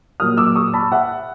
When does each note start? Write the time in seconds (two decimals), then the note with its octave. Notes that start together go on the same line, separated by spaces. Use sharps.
0.20 A#2 F#3 A#3 D#6 F6
0.38 D6 E6
0.55 C#6 D#6
0.74 A5 B5
0.92 E5 F#5